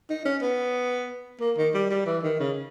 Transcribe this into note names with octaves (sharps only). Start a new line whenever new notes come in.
D#4
C#4
B3
A#3
D#3
G3
G3
E3
D#3
C#3